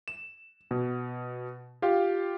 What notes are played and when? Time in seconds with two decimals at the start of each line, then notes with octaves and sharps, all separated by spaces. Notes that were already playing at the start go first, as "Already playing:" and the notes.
0.08 E7
0.71 B2
1.82 F4 G4 F5